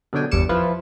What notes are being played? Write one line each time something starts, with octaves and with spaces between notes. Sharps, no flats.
B2 D3 F#3 D4 G5 G#5
G1 E2 G3 D6 C#7 E7
F3 E4 F4 B4 F5